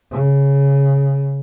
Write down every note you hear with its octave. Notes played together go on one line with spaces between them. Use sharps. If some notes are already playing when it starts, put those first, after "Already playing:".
C#3